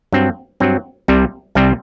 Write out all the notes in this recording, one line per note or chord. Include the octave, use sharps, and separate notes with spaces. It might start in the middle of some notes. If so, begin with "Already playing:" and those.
G2 F#3 C4
G2 F#3 C4
C2 C3 G3 C4
C2 C3 G3 C4